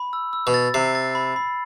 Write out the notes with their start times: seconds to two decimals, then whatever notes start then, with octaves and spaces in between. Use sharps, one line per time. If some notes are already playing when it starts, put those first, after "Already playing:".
Already playing: B5
0.13 E6
0.33 E6
0.47 B2
0.54 A6
0.74 C3 C7
0.95 A6
1.15 B5
1.36 B5